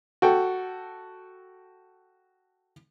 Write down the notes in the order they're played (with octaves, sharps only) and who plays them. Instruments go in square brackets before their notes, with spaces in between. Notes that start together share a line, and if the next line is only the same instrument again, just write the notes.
[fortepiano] F#4 A4 G5